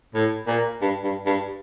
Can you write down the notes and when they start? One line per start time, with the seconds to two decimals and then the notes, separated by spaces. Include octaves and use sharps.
0.14 A2
0.47 A#2
0.81 G2
1.04 G2
1.26 G2